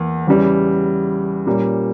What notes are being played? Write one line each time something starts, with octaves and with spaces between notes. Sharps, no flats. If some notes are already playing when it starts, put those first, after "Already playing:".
Already playing: E2 A#3
E2 C#3 G3
A#2 G3 A#3 C#4